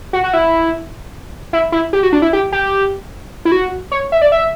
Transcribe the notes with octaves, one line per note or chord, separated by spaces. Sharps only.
F#4
F#4
E4
E4
E4
G4
F#4
D4
E4
G4
G4
E4
F#4
C#5
E5
D5
E5